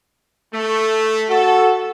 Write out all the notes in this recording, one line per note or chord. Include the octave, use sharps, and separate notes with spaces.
A3
F#4 A4